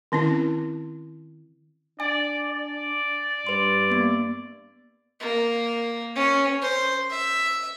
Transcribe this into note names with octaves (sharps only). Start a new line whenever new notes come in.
D#3 C4 C#4 E4
D4 D5 G#5
D5
G2 B4 C6
A#3 B3
A#3
C#4
C5
E5